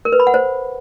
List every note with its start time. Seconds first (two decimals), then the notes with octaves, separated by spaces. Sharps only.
0.05 A#4
0.12 B4
0.20 B5
0.27 F#5
0.34 C5